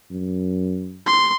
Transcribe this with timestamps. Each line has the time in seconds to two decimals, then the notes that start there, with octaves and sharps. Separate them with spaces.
0.11 F#2
1.07 C6